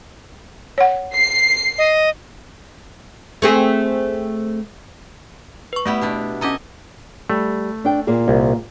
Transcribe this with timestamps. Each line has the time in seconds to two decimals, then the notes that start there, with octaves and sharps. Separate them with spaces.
0.78 C#5 F#5
1.15 C7
1.78 D#5
3.42 A3 C4 G#4
5.73 B4 C#6
5.86 G3 A3 B3 E4
6.01 B2 D4 E4
6.41 C#4 A4 D#5 G#5 A#5
7.30 G3 A3
7.85 D4 G5
8.07 A#2 A#3 G#4
8.28 C2